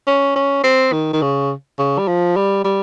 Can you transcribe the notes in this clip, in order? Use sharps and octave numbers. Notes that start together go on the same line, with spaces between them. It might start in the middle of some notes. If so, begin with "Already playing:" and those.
C#4
C#4
C4
D#3
D#3
C#3
C#3
G3
F3
G3
G3